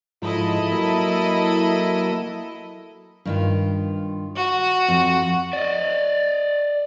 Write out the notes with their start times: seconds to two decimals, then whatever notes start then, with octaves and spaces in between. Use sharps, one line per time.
0.22 G#2 F3 E4 A4 D#5
0.72 F#3 A#3 E5
3.25 G2 D#3 F4
4.36 F#4
4.88 F2 F3
5.53 D5 D#5